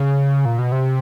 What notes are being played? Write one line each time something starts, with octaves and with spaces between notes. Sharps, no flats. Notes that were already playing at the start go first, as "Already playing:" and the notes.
Already playing: C#3
A#2
B2
C3